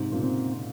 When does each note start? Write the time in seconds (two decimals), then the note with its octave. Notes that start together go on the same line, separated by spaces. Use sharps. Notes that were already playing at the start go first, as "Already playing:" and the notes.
Already playing: G#2 C3
0.12 A#2 C#3
0.23 C4